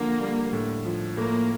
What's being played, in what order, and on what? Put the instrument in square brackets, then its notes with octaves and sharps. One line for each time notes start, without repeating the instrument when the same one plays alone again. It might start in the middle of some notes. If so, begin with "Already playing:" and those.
Already playing: [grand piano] D3 F3 [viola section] A#3
[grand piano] G3
A2
F3
[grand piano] A2 [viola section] A#3